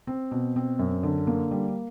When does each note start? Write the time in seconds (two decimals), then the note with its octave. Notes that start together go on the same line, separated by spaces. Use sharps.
0.07 C4
0.31 B2
0.56 C4
0.79 F#2
1.03 D3
1.27 A#3
1.51 G3